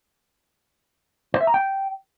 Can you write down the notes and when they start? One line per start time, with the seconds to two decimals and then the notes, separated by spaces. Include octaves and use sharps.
1.34 C5
1.41 E5
1.47 A#5
1.54 G5